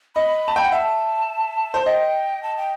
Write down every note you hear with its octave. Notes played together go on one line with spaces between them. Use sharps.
D#5 B5
A5
G5
F#5
E5 A5
C5
D#5 G5
A5
G5